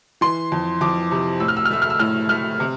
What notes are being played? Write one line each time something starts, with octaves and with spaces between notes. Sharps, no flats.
E3 C6
F2
F2 D6
C3
A2 E6
F6
E6
F6
A3 E6
F6
E6
A2 F6
A3 F6
C3